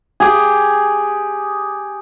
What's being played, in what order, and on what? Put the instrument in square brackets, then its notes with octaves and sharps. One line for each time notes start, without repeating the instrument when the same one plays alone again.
[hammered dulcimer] G4 G#4